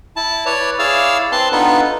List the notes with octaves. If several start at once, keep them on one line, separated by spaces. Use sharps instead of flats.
E4 A5
B4 C#5 D5
E4 G#4 C#5 D5 F5 E6
C4 B4 A5 C6
B3 D4 D#4 F4 A4 B4